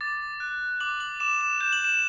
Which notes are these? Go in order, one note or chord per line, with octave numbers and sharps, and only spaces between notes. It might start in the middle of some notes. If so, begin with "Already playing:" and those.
D6 A6
F#6
D6 F#7
F#7
D6 E7
E7
G6 E7
F#7
E7